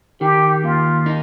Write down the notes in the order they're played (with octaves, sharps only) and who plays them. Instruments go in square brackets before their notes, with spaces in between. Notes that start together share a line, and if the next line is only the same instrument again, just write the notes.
[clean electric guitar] D#3 [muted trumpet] G4
[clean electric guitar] D#2 [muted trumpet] F4
[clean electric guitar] D#4